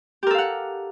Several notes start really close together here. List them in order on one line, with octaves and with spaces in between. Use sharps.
G4 A#4 A4 F5 F#5